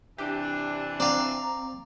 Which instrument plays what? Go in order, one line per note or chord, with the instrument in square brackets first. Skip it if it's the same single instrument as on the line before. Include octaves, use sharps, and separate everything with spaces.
[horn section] C3 E3 D4 [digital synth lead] G4
[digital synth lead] C4 [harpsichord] D5 F5 [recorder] A#5